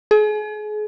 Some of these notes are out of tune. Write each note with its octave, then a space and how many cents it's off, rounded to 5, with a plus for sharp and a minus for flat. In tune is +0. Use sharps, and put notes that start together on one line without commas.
G#4 +35